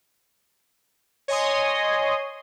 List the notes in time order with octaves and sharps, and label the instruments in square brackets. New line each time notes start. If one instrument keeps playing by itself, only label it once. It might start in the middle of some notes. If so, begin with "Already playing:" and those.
[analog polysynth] C#5 D#5 G#5 C6 D#6